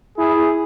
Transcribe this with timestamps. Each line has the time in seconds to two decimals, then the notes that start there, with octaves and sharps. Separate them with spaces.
0.18 E4 G#4